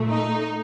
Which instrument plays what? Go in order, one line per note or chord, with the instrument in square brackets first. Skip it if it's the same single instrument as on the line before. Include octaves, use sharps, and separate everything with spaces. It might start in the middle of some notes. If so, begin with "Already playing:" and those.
Already playing: [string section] A#2 A3
D#4